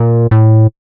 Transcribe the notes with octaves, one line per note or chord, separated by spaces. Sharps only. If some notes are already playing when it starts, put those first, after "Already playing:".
Already playing: A#2
A2